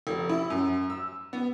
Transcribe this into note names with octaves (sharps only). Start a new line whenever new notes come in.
F1
E4
F#2
E6
B3